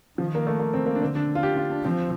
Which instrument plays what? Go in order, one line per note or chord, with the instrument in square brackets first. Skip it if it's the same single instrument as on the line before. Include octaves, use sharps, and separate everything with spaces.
[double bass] D#3 [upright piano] F3
[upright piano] A#3
A3
A#3
C4
A#3
D4
[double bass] D3 [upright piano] C4
[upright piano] D4
F4
G4
F4
D4
[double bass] F3 [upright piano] C4